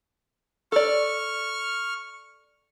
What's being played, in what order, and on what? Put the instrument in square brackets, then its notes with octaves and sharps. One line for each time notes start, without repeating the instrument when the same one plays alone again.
[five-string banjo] A4 D5 [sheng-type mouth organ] C#6 F6